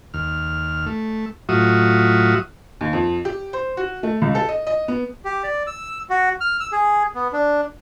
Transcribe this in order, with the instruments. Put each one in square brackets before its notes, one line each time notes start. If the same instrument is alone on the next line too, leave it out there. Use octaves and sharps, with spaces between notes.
[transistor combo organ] D#2 F6
A3
A2 F#3 F4 F#4 E5 D#6
[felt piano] D#2
F2
G4
C5
F#4
A3
C#2
A4
D#5
D#5
B3
[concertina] G4
D5
E6
F#4
F6
E6
G#4
B3
D4